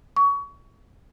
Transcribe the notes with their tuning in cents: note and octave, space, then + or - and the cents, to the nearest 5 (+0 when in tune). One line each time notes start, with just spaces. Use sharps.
C#6 +25